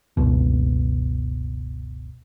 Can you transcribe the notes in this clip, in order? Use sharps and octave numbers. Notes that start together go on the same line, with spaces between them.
F#1 C#2 B2